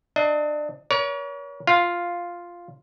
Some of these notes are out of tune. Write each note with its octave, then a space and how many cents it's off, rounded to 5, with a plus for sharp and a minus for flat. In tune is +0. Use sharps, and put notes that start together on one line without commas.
D4 +25 D#5 +40
A#4 +45 C#5 +35
F4 +0 F5 +5